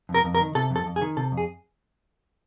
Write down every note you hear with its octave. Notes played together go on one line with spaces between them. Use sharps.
F2
A#4
F2
A#4
D#3
C3 A4
F2
A4
F2
G#4
D#3
C3 A4
F2
G#4